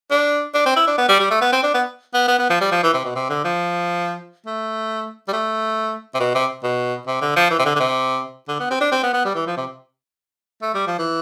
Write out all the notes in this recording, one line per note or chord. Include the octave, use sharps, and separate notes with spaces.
D4
D4
C4
E4
D4
B3
G3
G3
A3
B3
C4
D4
B3
B3
B3
B3
F3
G3
F3
E3
C3
B2
C3
D3
F3
A3
G3
A3
C3
B2
C3
B2
C3
D3
F3
E3
C3
D3
D3
C3
D3
B3
C4
D4
C4
B3
B3
G3
E3
F3
C3
A3
G3
F3
E3